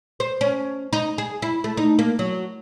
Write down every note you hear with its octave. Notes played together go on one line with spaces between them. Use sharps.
C5
C#4
D#4
G#4
E4
A3
D#4
A#3
F#3